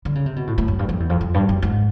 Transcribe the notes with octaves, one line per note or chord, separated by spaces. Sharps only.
D3
C#3
C3
B2
A2
A2
F#2
G2
F2
E2
F2
F2
G2
F#2
G#2